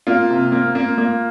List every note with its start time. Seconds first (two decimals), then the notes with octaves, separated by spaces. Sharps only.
0.07 A#3 F4
0.30 C3
0.52 A#3
0.75 A#3
0.98 A#3